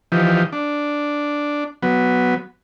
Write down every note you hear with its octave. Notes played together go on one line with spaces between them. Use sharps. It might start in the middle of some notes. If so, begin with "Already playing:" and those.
E3 F3 D#4 G4
D4
F#3 B3